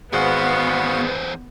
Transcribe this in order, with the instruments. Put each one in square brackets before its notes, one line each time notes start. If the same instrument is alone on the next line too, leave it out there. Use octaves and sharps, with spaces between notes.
[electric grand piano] G#1 G#4 [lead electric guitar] E2 C5 [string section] B3 [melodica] F#4 F5 F#5